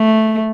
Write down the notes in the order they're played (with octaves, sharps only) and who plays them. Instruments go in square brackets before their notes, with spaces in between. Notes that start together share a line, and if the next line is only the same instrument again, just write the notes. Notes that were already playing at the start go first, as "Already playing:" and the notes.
Already playing: [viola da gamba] A3